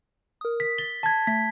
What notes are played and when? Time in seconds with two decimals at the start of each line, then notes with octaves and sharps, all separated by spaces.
0.41 A#4 D#6
0.60 B6
0.78 A6 G7
1.03 A5 G#6 A6 B6
1.27 A3 B6